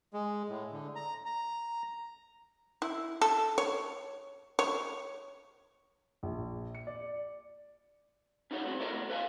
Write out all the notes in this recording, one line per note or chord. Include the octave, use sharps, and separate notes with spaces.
G#3
A2
D3
A#5
A#5
E4
A4
C#5
C#5
A#1
C#7
D5
C#4 D#4 F#4 G#4 C#5
A2 G3 C4 F#4
E4 F#4 A4 A#4 C#5 D#5
A2 B3
A4 B4 C5 F5 G#5